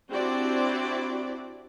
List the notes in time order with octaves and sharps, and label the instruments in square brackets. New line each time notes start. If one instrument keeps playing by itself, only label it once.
[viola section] C4 D4 E4 F#4 G4 D5